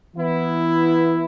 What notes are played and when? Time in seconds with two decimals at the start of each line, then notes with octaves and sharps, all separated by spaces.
0.16 E3 B3 E4